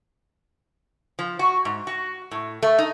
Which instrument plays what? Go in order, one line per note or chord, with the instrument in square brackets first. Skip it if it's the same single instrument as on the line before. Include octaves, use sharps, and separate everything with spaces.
[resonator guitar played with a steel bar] F3
F#4
G#2
F#4
A2
A3
D#4